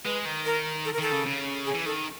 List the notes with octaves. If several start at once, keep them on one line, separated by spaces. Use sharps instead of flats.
G#3 B4
D#3
A#4
A4
A#4
D#3 A4
C#3
C#3
G#4
E3
D#3 A4